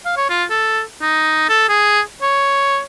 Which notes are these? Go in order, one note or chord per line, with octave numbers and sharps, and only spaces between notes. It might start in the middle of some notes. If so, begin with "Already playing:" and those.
F5
C#5
F4
A4
D#4
A4
G#4
C#5